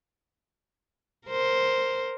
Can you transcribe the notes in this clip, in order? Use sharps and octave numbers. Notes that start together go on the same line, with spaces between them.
A#4 C5